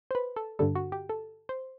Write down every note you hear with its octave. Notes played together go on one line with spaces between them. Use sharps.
C5
B4
A4
G2 D3 G3 A4
F#4
G4
A4
C5